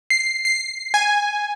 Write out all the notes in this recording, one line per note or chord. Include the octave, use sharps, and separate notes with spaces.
C7
C7
G#5